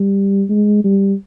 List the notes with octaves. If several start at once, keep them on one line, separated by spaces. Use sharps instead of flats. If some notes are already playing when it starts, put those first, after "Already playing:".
Already playing: G3
G#3
G3